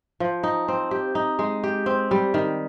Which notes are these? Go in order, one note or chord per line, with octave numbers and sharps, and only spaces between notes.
F3
D#4
C4
G4
D#4
G#3
G4
C4
G3
D#3